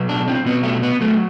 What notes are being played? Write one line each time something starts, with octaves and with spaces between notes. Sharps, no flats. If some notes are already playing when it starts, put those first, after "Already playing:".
Already playing: B2 F#3
D4
C4
B2 F#3 B3
A3
B3
F#3 A3